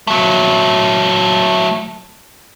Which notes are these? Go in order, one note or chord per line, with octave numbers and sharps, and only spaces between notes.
F#3 A3